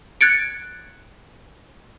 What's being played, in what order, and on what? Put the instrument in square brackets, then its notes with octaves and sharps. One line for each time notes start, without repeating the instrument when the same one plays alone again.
[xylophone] F#6 G#6 A6 C#7 D7